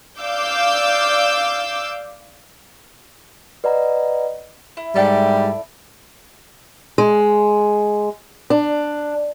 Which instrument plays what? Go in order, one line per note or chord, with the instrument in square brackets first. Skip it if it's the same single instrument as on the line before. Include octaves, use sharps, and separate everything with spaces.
[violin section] D5 F5 D6 E6 G6
[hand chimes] B4 D5 D#5 F#5 A#5
[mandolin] E4
[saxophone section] G#2 G3 [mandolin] E4 A4 D5
[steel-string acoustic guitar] G#3
D4